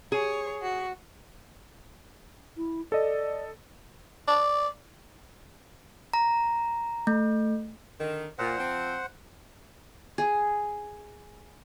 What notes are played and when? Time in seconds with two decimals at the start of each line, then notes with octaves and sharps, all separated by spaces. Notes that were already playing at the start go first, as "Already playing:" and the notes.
0.12 G#4 C#5
0.62 F#4
2.57 E4
2.92 A4 D5 D#5
4.28 D5
6.13 A#5
7.07 A3
7.99 D3 D#3
8.38 A#2 C5 F#5
8.58 F3 C4
10.18 G#4